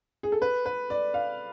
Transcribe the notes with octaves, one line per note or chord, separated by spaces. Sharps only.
G#4
A4
B4
B4
D5
F5